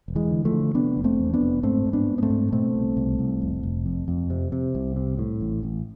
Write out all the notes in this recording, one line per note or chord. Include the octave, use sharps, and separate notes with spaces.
E1
E3 G#3
D3
F3 A3
D3
C3 B3 D4
F1
A3 C4
E2
B3 D4
F1
G#2 A3 C4
G#2
B3 D4
G#2
B3
A3 C4
G#2
B2 A3 C4
C2
C2
C2
F1
F1
F2
F2
C3
C3
C2
C3
A2
A1
A1